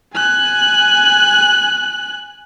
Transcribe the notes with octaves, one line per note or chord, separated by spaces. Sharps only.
G#5 F#6